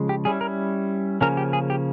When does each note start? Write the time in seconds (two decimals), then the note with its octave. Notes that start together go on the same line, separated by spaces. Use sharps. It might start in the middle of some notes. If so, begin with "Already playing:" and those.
Already playing: C#3 F3 G#3
0.09 G4
0.25 G3 C#4 E4 G#4
0.41 A#4
1.21 C#3 F3 A#3 C#4 A#4
1.37 G4
1.53 G#4
1.70 G4